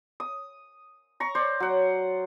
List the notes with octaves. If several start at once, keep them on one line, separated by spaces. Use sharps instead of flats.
D#6
A#5 C#6
C5 D5
F#3 F#5